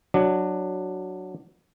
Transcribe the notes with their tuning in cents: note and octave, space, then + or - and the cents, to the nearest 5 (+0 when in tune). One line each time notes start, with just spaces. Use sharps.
F#3 +0 D4 +15